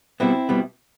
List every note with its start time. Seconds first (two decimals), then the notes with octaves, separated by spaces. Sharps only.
0.20 B2 G3 B3 C4 E4
0.49 B2 G3 B3